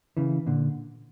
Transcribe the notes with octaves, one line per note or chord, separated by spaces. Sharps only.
C#3 E3
A#2 D3